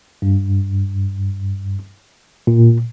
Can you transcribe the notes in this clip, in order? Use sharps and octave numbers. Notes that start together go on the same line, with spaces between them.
G2
A#2